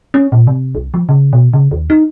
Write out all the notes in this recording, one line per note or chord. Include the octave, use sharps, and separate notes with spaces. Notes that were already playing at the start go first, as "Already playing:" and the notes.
C#4
A#2
C3
C2
F3
C#3
B2
C#3
D#2
D#4